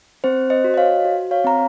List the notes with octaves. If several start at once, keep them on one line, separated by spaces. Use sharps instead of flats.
C4 C5
C5 D#5
F#4
D#5
C#5 F5
F#4
C#5 F5
C4 A#5